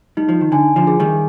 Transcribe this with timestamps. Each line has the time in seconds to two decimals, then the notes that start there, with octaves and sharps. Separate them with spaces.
0.17 G3 D#4
0.29 F3
0.41 D#3
0.52 D3 G#5
0.76 D3 F3
0.87 G#4
1.00 D#3 G3